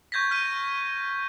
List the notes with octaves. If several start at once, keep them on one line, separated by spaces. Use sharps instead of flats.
C#6 G6 G#6 A#6 B6
F6 B6 D#7